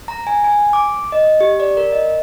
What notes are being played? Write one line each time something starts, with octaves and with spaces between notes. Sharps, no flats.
A#5
G#5
G#5
D6
D#5
G4
D5
A#4
D#5